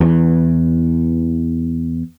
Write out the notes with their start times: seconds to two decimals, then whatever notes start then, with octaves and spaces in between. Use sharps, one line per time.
0.01 E2 E3